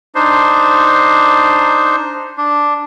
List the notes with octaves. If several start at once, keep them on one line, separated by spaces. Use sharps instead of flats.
D4 D#4 C5
D4